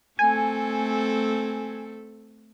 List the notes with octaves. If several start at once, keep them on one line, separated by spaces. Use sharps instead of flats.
A3 C4 A4 G#5